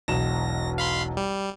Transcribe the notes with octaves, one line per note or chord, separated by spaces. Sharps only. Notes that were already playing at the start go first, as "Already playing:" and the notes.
E1 B1 A#6 E7
F5 B5 C6
G3